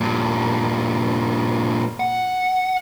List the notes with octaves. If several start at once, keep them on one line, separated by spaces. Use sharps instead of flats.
G2 A#2
F#5